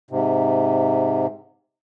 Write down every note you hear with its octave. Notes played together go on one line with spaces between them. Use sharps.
G#2 C3